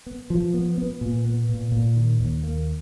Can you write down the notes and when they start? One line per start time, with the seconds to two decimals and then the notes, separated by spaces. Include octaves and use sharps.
0.06 B3
0.30 F3
0.54 B3
0.78 B3
1.01 A#2
1.25 B3
1.49 A#2
1.72 A#2
1.96 D#3
2.20 D#2
2.43 A#3